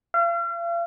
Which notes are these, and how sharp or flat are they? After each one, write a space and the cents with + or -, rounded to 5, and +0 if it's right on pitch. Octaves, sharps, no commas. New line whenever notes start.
F5 -40